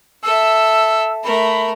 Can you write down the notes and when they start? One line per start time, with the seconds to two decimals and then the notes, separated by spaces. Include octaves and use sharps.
0.23 A4 E5 E6
1.24 A3 A#4 B5